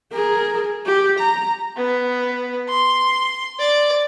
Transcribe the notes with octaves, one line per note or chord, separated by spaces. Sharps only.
G#4 A#4
G4
A#5
B3
C6
D5